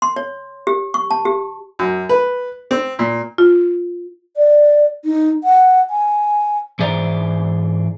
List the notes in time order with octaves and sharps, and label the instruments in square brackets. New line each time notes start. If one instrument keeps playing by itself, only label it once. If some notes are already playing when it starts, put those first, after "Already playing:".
[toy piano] C6
C#5
G4
C#6
A5
G4
[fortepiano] F#2
B4
C4
A#2
[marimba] F4
[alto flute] D5
D#4
F#5
G#5
[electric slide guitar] G#2 E3 G#4 C5 D5 A#5